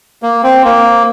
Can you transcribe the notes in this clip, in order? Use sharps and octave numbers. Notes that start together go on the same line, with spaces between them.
A#3
C4
A#3